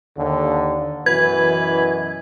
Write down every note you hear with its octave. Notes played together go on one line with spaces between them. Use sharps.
D#2 D3
F#2 B2 E3 B4 G#6